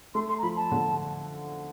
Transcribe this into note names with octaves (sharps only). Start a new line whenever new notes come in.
A3 C6
C6
A#5
F3 B5
A5
D3